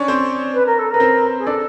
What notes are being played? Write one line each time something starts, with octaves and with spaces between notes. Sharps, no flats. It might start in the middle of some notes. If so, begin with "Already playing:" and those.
Already playing: C#4 D4 C#5 D5
C4 C5
B4
A#4
A4
A#4 B4
C4 C5
G#4
D4 A4 D5